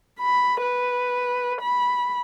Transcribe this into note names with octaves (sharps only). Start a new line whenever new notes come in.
B5
B4
B5